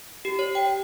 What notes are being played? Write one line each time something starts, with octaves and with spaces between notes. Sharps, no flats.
G4
C#5
G5